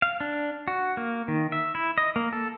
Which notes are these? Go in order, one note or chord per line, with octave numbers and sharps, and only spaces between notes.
F5
D4
F#4
A#3
D#3
E5
E4
D#5
A#3
A4